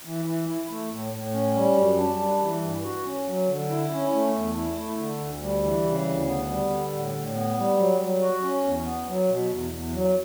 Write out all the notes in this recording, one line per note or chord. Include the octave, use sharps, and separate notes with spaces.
E3
E3
E4
A3
A2
A2
C#4
G3
F#2
D4
G3
E3
G2
F#4
C#4
F#3
D3
E4
C#4
A3
E2
E4
A3
D3
D2
G3
E3
C#3
D2
B3
G3
D3
A2
A2
B3
G3
F#3
F#3
F#4
C#4
E2
B3
F#3
B2
E2
E2
F#3